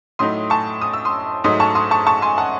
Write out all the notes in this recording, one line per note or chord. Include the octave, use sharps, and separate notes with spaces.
A2 F#3 A3 D#4 C6 D#6
A5 C#6
D#6
E6
C6 D#6
G#2 F#3 A3 D#4 C6 D#6
A5 C#6
C6 D#6
A5 C#6
A5 C#6
G#5 C6
F#5 A5